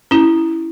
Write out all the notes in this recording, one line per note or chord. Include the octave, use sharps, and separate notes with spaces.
C#4 E4